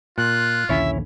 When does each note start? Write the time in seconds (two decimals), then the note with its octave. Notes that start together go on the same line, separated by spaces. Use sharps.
0.18 A#2 F4 F#6
0.69 A#1 D#2 D3 C#4 E4 C#5 E5